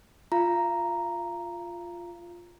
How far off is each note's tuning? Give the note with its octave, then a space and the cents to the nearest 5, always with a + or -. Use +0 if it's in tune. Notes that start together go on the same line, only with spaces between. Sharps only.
F4 +0 F5 -40 A#5 +0